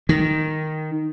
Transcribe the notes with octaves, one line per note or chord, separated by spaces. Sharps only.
D#3